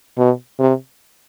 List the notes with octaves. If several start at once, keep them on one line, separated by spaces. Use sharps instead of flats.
B2
C3